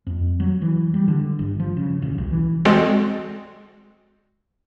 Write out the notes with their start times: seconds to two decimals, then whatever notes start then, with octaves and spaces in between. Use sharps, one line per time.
0.07 F2
0.40 F#3
0.62 E3
0.94 G3
1.08 D3
1.39 G1
1.60 F3
1.77 C#3
2.02 D1
2.18 B1
2.31 E3
2.65 G#3 C4 F#4 A4 D5 D#5